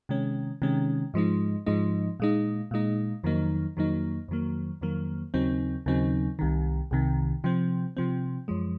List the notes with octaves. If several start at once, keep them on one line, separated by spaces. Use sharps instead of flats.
C3 D#3 G#3 C#4
C3 D#3 G#3 C#4
G#2 F3 G#3 D#4
G#2 F3 G#3 D#4
A#2 G#3 D#4
A#2 G#3 D#4
F2 D#3 F#3 A#3 D#4
F2 D#3 F#3 A#3 D#4
F2 D#3 F#3 A#3
F2 D#3 F#3 A#3
D#2 C#3 F#3 C4 D#4
D#2 C#3 F#3 C4 D#4
C2 C3 D#3
C2 C3 D#3
C3 F3 C4
C3 F3 C4
F#2 F3 G#3